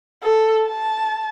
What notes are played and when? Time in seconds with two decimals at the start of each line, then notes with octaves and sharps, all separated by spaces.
0.23 A4
0.68 A5